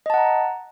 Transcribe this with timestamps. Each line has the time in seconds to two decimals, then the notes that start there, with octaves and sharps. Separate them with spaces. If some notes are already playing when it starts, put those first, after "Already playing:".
0.06 D#5
0.10 A5
0.14 F#5
0.18 A#5